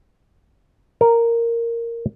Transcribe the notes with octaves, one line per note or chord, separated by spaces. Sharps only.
A#4